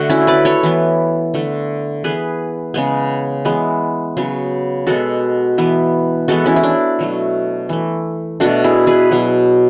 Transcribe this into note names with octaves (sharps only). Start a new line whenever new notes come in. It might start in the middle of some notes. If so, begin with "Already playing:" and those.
Already playing: D3 A3 F#4
C#4 E4
B4 D5
A4 C#5
E3 B3
D3 A3
E3 B3 G#4 B4
C#3 G#3 B3
E3 G#3 B3
C#3 F#3 B3
B2 G#3 B3 F#4 A4
E3 B3
E3 G#3 B3 F#4 A4
C#4 E4
E4
D4
B2 F#3 A3
E3 A3
B2 A3 D4 F#4
E4 G#4
G#4 B4
B2 F#3 B3